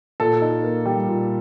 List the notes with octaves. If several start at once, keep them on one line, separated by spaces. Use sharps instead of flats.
A#2 A4
D#4
A#3
G3
A#2